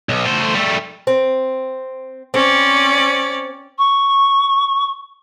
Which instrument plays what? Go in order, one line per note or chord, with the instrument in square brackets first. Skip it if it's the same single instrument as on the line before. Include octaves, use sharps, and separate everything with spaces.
[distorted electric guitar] B1
A3 C5
G3 A3
[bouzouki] C4
[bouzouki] C4 [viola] C#4 D5
[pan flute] C#6